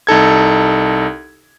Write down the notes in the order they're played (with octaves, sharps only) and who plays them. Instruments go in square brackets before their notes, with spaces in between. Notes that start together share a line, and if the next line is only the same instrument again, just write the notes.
[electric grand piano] C2 D#4 A4 G#6